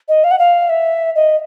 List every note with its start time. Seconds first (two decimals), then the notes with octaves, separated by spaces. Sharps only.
0.08 D#5
0.24 F5
0.31 F#5
0.39 F5
0.69 E5
1.15 D#5